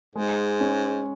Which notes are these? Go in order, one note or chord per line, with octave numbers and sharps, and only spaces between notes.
G#2 G#3
C#4